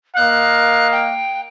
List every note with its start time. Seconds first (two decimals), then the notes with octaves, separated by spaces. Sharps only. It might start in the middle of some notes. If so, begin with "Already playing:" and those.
0.16 A#3 D#5 F5 F#6
0.92 G5